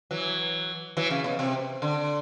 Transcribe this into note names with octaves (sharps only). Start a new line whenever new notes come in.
E3 F#3
E3 F#3
C#3
B2
C3
D3